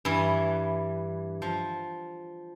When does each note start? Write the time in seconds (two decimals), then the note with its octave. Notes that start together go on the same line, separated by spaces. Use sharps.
0.05 G2 E3
1.42 F3